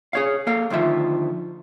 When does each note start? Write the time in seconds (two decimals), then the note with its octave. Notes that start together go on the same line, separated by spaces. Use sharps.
0.13 G#4 C#5 F5
0.47 A#3 A4 F5
0.70 D2 D#3 F3 E5